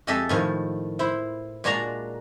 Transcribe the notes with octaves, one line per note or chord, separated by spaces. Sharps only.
F2 G#3 G4 A4 D#5 E5
A2 D#3 F3
E4 C5
A#2 G#3 D4 F#4 D5 A#5